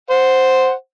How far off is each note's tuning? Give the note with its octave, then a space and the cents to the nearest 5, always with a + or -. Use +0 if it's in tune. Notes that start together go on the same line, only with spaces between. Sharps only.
C5 +0 F#5 +0